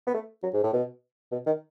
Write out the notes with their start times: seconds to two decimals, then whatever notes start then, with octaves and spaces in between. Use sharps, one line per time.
0.07 B3
0.14 A3
0.43 F#3
0.54 G#2
0.64 A2
0.74 B2
1.32 B2
1.47 D#3